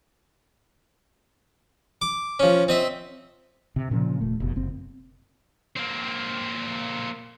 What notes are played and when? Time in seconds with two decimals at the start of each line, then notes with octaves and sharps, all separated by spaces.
2.02 D6
2.40 F3 C#4
2.68 C4 D#5 E5
3.76 C3
3.91 A#2 C#3 F3
4.21 D#1 A3
4.40 F1 B2
4.56 F#1 C4
5.76 A#3 C4